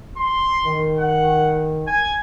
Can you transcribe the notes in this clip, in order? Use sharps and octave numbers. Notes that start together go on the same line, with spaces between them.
C6
D#3
F#5
G#5